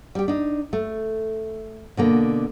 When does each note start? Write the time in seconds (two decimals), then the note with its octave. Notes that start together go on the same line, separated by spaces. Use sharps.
0.15 G3 G4
0.28 D4 D#4
0.73 A3
1.97 B2 D3 A#3